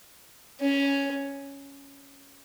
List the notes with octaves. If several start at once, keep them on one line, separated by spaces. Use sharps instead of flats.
C#4